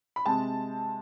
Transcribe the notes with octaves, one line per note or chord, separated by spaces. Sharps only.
B5
C3 G#3 C4 A5